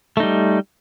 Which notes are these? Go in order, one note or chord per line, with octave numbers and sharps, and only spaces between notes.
G3 A3 D#4